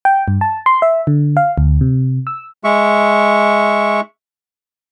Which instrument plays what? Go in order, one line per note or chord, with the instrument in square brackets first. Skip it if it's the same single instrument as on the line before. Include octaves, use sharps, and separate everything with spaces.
[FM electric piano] G5
G2
A5
C6
E5
D3
F5
D2
C3
E6
[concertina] G#3 E5 C#6